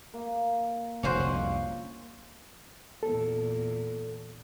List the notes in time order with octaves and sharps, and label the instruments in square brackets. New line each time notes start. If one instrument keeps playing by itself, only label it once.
[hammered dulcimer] A#3
[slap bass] F1 D#3 [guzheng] C#4 F#4 C5
[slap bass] F1 C2 D3 [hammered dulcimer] F4
[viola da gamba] E2 A#2 [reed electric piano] A4